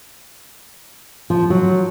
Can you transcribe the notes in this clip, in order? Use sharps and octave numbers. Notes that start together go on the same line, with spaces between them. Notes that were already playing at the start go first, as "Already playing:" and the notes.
F3
F#3